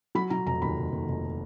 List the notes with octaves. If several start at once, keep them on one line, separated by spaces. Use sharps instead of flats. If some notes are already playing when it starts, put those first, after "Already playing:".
F#3 B5
F#3 A#5
F1 A#5
D#2 B5
F1
D#2
F1